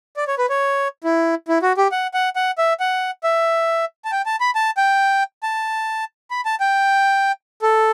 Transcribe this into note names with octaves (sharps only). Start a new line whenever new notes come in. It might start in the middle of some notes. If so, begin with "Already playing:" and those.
D5
C#5
B4
C#5
E4
E4
F#4
G4
F#5
F#5
F#5
E5
F#5
E5
A5
G5
A5
B5
A5
G5
A5
B5
A5
G5
A4